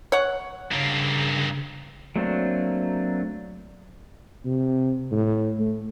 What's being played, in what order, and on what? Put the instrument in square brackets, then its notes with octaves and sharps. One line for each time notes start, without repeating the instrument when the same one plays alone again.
[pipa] C#5 F#5
[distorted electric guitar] G2 A#3 [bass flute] C#3
[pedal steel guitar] F#3 A3 A#3 C4 D4
[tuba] C3
A2
A3